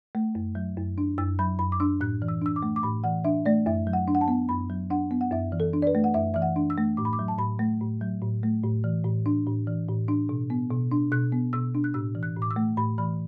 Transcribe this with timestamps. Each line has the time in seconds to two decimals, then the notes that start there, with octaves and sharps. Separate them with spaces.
0.15 A3
0.35 F#2
0.55 F#3
0.77 F#2
0.98 D4
1.18 F#2 E6
1.39 F#3 B5
1.59 F#2 B5
1.72 D6
1.80 D4 E6
2.01 A2 F#6
2.22 E3
2.28 E6
2.42 D4 E6
2.56 D6
2.63 A3
2.76 D6
2.83 A2 B5
3.04 E3 F#5
3.24 D4 E5
3.46 A3 D5
3.66 F#2 E5
3.87 F#3
3.93 F#5
4.08 D4
4.15 F#5
4.21 A5
4.28 B3
4.49 F#2 B5
4.70 F#3
4.90 D4 F#5
5.11 B3
5.21 F#5
5.31 F#2 E5
5.52 E3
5.60 A4
5.73 D4
5.82 D5
5.87 B4
5.95 A3
6.04 F#5
6.14 F#2 E5
6.34 E3 E5
6.42 F#5
6.56 D4
6.70 E6
6.78 A3
6.97 A2 D6
7.05 B5
7.13 D6
7.19 F#3
7.28 A5
7.39 A2 B5
7.59 A3
7.81 A2
8.01 F#3
8.22 A2
8.43 A3
8.64 A2
8.84 E3
9.05 A2
9.26 D4
9.47 A2
9.67 E3
9.88 A2
10.08 D4
10.29 B2
10.50 B3
10.70 B2
10.92 D4
11.12 B2 F#6
11.32 B3
11.53 B2 E6
11.75 D4
11.84 F#6
11.94 A2 E6
12.15 E3
12.23 F#6
12.36 A2
12.42 D6
12.51 E6
12.56 A3
12.77 A2 B5
12.98 E3 B5